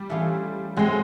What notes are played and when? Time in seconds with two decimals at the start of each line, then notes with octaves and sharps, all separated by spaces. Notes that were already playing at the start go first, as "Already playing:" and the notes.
Already playing: G3
0.09 E3 A3 C#4 F4 G#4
0.76 F#3 G#3 A3 C4